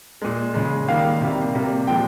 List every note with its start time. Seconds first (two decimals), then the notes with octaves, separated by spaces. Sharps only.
0.22 A#2 G#3
0.54 C#3 G#3
0.88 D#3 G3 A#3 F5
1.21 C3 G3 A#3
1.55 C3 G3 A#3
1.87 A#2 F3 G#3 G5